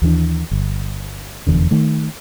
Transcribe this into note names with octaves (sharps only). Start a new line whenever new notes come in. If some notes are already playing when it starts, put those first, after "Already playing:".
D#2 E3 D4
G1
F1 E2 D3
D#3 A3